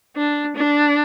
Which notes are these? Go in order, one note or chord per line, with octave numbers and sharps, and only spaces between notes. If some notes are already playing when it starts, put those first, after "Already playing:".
D4
D4